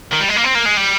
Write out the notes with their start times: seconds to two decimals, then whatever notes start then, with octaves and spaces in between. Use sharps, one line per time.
0.12 D#3
0.20 G3
0.28 G#3
0.36 A#3
0.44 C4
0.55 A#3
0.65 G#3
0.77 G3